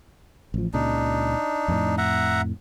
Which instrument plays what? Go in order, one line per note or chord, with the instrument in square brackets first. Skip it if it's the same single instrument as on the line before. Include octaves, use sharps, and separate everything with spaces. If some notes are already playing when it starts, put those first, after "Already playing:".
[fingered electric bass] A1 F3
[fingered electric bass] C#2 A#2 C#3 [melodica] D4 D#4
[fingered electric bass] F2 A2
[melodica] E5 F#5 A#5